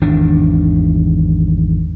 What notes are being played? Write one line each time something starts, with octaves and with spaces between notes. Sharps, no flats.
G#1 E2 D#3 D4